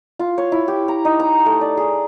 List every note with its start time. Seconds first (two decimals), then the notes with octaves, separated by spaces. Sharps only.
0.19 F4
0.38 C#5
0.52 E4
0.68 G4
0.88 A#5
1.05 D#4
1.20 A#5
1.46 A3
1.61 D5
1.77 G#4